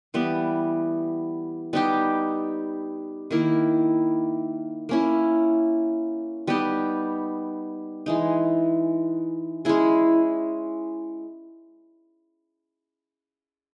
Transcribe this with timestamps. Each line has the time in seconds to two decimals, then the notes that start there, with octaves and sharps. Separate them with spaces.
0.14 E3 G3 B3
1.73 G3 B3 D#4 G4
3.31 D#3 A#3 E4
4.89 A#3 C#4 E4
6.47 G3 B3 D#4 G4
8.06 E3 G#3 D#4
9.65 G#3 C#4 E4 G#4